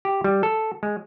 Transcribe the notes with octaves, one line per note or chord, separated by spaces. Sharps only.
G4
G3
A4
G#3